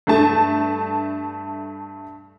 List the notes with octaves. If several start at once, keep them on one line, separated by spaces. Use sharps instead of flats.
G2 A3 A5